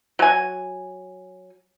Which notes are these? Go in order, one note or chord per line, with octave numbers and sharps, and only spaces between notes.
F#3 G#5